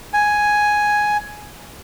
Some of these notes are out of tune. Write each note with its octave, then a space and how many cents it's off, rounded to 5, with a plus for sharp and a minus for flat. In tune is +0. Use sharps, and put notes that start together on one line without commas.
G#5 +5